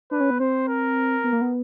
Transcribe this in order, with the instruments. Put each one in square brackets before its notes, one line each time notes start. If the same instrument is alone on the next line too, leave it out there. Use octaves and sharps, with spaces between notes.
[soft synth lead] D4 [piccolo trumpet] B4
[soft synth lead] C#4
B3
[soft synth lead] C4 [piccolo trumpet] C5
[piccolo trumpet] A#4
[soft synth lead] B3
A#3
B3